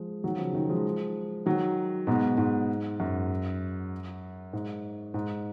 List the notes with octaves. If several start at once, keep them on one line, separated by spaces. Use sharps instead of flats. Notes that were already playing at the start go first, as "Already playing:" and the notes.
Already playing: F3 G#3
D#3 F#3
C#3 F3
D#3 F#3
F3 G#3
D#3 F#3
G#2 B2
G#2
F#2
G#2
G#2